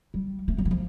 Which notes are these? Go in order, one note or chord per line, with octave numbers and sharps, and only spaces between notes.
G3
A3
G3
E3
F3